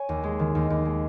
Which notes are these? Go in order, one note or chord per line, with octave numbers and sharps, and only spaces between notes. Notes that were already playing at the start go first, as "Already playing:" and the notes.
Already playing: C#5 G#5
D#2
G#3
D#3
D#2
D#2
G#3